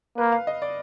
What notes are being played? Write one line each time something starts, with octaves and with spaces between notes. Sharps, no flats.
A#3 B4
F5
D#5
D5